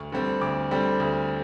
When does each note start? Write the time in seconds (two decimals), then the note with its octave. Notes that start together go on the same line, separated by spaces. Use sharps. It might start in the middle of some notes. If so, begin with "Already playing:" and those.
Already playing: D2 C#6
0.12 D3 G3 C4
0.41 D2 D6
0.71 D3 G3 C4
1.00 D2